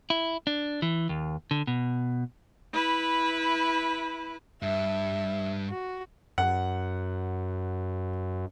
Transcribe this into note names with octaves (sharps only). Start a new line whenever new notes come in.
E4
D4
E3
D#2
D3
B2
E4 B4
G2 E5
F#4
F#2 F#5